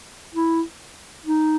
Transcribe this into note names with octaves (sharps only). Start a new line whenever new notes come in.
E4
D#4